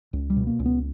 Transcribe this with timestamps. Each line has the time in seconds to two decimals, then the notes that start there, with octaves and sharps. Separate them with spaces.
0.13 C#2
0.30 G3
0.37 B2
0.47 A#3
0.59 C#2
0.66 B3